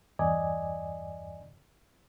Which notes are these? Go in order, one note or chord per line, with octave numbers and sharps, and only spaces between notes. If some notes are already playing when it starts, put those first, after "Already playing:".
E2 G2 D5 D#5 G#5